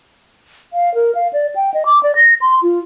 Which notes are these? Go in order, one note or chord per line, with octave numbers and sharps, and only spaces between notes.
F5
A#4
F5
D5
G5
D#5
D6
D5
A#6
C6
F4